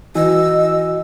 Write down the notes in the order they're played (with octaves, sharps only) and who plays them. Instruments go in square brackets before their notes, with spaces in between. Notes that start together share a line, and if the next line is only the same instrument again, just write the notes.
[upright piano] E3 [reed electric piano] F#4 [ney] D#5 [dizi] E6